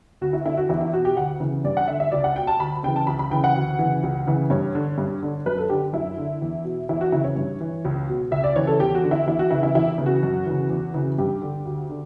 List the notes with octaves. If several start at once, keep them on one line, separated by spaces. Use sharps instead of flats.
D2 F#4
E4
D3 E4
F#4
E2 E4
E4
B2 F#4
G4
D2 F#5
C#3 E3
G2 D5
F#5
D3 E5
E5
C#2 D5
F#5
B2 G5
A5
D2 B5
C#3 E3 G5
A5
C#2 B5
B5
C#3 E3 G5
F#5
D2
C#3 E3
C#2
C#3 E3
G2 C#5
D3
G2
D3
F#2 B4
A4
D3 G4
F#2 E4
D3
E2
B2
E2 E4
F#4
C#3 E3 E4
C#5
G2
E3
C#2
B2
C#2 E5
D5
C#3 E3 C#5
A4
E2 G4
F#4
D3
E4
E2 E4
F#4
C#3 E3 E4
E4
E2 E4
C#3 E3
F#4
F#2
C#3 E3
E2
C#3 E3
G2 G4
D3
D2
D3